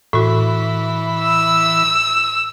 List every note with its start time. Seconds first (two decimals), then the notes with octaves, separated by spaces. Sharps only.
0.13 A2 E3 F#4 B5
1.21 E6